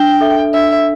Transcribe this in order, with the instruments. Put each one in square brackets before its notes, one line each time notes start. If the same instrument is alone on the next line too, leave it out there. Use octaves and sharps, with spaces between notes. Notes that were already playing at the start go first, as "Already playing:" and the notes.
Already playing: [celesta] D4 [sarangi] G5
[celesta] A4 E5
[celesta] D4 [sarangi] E5